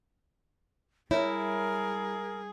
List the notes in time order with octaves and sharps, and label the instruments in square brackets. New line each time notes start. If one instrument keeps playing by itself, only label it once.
[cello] G3 G#4 [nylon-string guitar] E4 [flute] A#4 [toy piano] C#5 E5